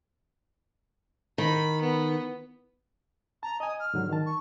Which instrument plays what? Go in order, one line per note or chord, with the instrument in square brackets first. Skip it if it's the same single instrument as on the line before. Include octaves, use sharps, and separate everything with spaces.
[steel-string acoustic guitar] D#3 [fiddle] B5
[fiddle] B3
[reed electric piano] A5 [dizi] A#5
[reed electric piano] D#5 G#5 [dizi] D#6
[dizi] F6
[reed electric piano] G#2 D3 F#3
D#3 A5
[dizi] C#6